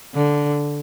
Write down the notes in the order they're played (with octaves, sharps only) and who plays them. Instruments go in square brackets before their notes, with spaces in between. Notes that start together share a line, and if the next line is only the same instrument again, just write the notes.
[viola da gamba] D3